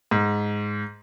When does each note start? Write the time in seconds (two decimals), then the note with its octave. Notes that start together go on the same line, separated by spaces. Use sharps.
0.11 G#2